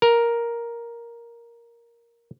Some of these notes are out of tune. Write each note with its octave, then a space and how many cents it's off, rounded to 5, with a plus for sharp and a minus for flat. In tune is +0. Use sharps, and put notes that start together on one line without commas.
A#4 +5